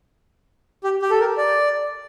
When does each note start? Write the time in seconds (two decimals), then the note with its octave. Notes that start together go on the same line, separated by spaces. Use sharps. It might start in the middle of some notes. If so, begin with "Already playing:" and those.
0.84 G4
1.02 G4
1.10 A4
1.20 A#4
1.37 D5